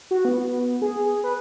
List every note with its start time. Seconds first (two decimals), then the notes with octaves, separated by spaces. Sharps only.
0.11 F#4
0.25 B3
0.82 G#4
1.24 B4